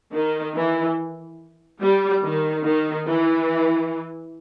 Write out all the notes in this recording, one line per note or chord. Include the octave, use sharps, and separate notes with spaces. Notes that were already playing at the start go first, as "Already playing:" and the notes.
D#3
E3
G3
D#3
D#3
E3